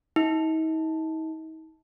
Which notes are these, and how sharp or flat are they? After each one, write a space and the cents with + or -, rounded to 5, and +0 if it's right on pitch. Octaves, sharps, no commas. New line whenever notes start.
D#4 +40